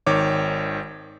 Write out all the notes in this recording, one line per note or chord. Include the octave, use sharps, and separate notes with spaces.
G#1 D#3 C#5 D6